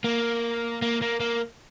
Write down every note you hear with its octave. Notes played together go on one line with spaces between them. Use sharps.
A#3
A#3
A#3
A#3